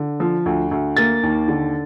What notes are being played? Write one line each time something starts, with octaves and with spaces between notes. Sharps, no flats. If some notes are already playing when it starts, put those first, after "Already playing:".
Already playing: D3
F3
D2
D2
A#3 A6
D#2
D3